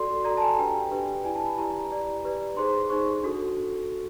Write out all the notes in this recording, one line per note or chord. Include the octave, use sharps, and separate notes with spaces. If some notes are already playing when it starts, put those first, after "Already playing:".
Already playing: F#4 A4 D5 C6
F#4 A4 D5 A#5
A5
G#5
D4 G4 B4 G5
G5
D4 G4 B4
E4 G4 B4 D5 G#5
A5
B5
E4 G4 B4 D5 A#5
G4 B4 D5
G4 B4 D5
D#4 G#4 C5 C6
D#4 G#4 C5 C#6
D4 F#4 A4